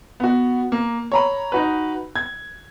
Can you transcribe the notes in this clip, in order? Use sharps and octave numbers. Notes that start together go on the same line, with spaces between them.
B3 F#4
A#3
C#5 A#5 B5
D#4 F#4 B4
G#6